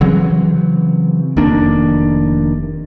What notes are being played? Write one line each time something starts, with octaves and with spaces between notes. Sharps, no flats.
C#3 E3 F#3 C4
F1 D#3 A#3 D4